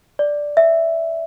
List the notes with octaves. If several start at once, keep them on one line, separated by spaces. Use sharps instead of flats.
D5
E5